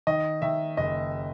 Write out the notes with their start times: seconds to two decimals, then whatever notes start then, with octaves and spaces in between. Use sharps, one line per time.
0.07 D#3 D#5
0.42 D#3 E5
0.77 F#1 D#5